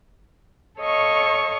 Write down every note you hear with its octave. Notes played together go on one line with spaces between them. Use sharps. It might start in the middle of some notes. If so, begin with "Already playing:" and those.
A4 C#5 D#5 F5 C#6